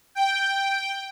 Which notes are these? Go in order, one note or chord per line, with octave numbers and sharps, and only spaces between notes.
G5